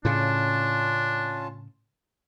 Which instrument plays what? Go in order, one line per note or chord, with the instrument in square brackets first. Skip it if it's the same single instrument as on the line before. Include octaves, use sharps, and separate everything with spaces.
[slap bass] A2 C#3 [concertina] C#4 F4 A5 [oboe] D4